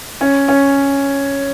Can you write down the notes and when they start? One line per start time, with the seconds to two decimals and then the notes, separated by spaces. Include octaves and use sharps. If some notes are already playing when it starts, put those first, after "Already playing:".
0.21 C#4
0.48 C#4